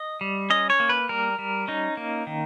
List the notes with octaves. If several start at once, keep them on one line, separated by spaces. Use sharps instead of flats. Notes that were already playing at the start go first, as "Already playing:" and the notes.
Already playing: D#5
G3
C#4 D#5
C#5
A#3
B4
G3 A#4
G3
C#4 D#4
A#3
D#3